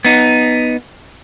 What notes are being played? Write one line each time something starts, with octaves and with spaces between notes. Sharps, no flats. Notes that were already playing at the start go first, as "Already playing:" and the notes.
B3 D#4